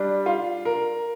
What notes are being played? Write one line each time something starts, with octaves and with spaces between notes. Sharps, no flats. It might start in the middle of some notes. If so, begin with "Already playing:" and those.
Already playing: G3 D4
F4
A#4